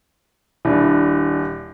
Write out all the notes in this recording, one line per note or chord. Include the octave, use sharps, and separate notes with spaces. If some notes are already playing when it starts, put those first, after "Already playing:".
D#1 D4 E4